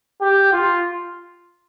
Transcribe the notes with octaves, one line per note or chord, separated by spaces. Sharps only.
G4
F4